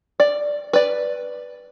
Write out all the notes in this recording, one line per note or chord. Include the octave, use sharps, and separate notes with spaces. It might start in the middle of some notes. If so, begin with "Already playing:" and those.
D5
B4 D5